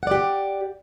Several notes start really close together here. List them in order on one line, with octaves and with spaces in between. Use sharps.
F#5 D5 G4